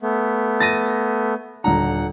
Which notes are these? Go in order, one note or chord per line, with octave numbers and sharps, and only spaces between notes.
A3 B3
A6 A#6 D#7
D#1 D3 F#5 A#5